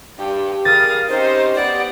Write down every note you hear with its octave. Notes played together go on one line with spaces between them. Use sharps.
G2 G4
G3 G#4 A#4 F5 D#6 A6
C4 C#4 D#4 G4 C5
B3 G4 D5 F#5